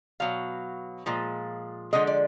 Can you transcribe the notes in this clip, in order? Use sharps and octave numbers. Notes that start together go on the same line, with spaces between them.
B2 F#3 F5
A#2 F3 G#3
D3 F3 G#3 D#5
D5